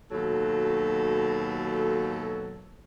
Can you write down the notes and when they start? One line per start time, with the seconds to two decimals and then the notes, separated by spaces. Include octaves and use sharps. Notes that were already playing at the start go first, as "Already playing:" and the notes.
0.11 D#2 B2 F#3 A4